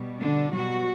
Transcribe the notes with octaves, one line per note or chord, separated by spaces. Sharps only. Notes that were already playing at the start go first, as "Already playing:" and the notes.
Already playing: B2 G3
D3 D4
B2 F#3 G3 F#4